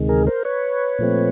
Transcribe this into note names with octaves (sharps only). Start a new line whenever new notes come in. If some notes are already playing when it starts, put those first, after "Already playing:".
Already playing: D2 C3 D#3 G#3
G#4 A#4
A#4 C5
B4 C#5
A#2 F3 A3 C4